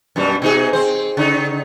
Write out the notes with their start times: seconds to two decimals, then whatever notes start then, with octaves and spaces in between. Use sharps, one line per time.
0.16 F#2 B2 G3
0.42 B2 D#4 G#4
0.73 C4 C5
1.17 C#3 D#4